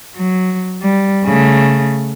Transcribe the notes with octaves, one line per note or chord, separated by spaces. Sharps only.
F#3
G3
C#3 A3